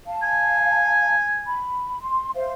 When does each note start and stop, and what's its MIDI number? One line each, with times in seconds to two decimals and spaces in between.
0.07 1.16 77
0.07 1.16 81
0.22 1.64 80
1.46 1.97 83
2.00 2.30 84
2.35 2.53 72
2.35 2.53 76
2.35 2.53 77